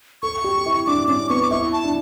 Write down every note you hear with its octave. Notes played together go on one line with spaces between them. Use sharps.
A4 C#6
G4
E4
D4 D6
C#4 D6
B3 C#6
D6
E4 C#6
A5
D4